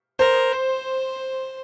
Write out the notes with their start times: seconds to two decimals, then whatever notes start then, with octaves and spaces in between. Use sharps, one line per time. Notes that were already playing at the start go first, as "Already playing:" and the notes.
0.19 A#4 C5
0.53 C5